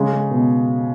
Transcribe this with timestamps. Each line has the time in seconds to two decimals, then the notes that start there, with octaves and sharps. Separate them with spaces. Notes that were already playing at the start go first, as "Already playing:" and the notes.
Already playing: C#3 G#3
0.13 G#3
0.31 B2